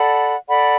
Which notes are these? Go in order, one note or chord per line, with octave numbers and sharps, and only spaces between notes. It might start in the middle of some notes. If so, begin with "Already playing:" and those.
Already playing: A4 D5 F#5 B5
A4 D5 F#5 B5